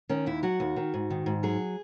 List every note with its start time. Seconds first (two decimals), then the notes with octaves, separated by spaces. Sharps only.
0.09 D#3 C#4
0.26 D#2 E4
0.43 F#3 F#4
0.60 D#2
0.76 D#3
0.94 G#2
1.10 D#3
1.26 G#2
1.43 F#3 G#4